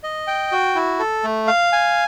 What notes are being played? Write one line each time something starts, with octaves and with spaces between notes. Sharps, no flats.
D#5
G5
F#4
E4
A4
A3
F5
G#5